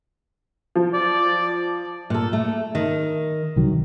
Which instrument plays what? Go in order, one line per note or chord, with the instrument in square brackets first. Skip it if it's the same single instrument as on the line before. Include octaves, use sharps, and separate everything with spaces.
[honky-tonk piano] F3
[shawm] D5
[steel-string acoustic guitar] A#2 A4
A3
D#3
[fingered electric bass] C2 D#3 F#3